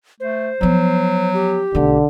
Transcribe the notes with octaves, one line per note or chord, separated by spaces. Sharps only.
A3 C5
F3 F#3 B3
G4
B1 D3 A3